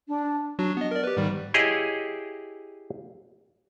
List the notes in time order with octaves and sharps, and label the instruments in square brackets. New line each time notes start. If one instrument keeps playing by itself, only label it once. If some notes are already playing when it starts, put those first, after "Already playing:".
[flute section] D4
[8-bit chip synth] F#3 D4 F#4
B3 D#5
A#4 D5
G4 B4
G#2 D#3 G3
[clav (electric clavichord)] E4 G4 G#4 C#5 D#5 F5